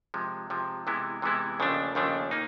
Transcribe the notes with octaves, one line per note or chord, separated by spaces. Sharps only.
C3 F3 G#3
C3 F3 G#3
C3 E3 G#3 B3 E4
C3 E3 G#3 B3 E4
D#2 C#3 F3 A3 D4
D#2 C#3 F3 A3 D4
A#3 D#4